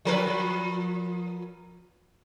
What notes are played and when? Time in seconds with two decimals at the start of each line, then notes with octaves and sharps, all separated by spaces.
0.05 F3 A#4 B4